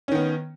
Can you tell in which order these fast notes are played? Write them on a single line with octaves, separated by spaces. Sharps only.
C#4 D#3 B3